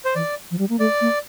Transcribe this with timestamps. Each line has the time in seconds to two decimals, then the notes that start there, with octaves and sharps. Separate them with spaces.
0.05 C5
0.15 E3 D5
0.51 F3
0.59 G3
0.69 A#3
0.79 A3 D5
1.01 A#3